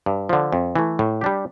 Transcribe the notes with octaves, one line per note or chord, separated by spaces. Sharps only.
G2
D3 F3
F2
E3 A3
A2
G3 D4 G4